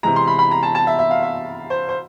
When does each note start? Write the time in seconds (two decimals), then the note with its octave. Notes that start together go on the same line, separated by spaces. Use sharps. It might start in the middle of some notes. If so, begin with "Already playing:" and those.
0.03 C3 E3 G#3 A#5
0.16 C6
0.27 B5
0.39 B5
0.51 A#5
0.63 A5
0.75 A5
0.87 E5
0.99 E5
1.11 F5
1.23 E5
1.70 C5
1.89 C5